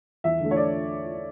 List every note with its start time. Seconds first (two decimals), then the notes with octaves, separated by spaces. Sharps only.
0.24 E2 E5
0.40 D3 A3
0.51 C#5
0.56 D5